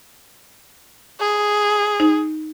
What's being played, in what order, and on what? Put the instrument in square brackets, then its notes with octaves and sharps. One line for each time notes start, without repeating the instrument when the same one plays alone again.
[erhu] G#4
[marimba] D#4